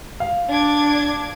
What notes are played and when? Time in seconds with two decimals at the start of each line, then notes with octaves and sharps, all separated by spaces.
0.20 F5
0.50 D4 D6 G#6